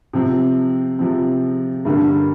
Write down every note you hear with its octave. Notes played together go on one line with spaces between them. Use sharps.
C3 F3 C4
C3 F3 C4
G2 D3 G3 A#3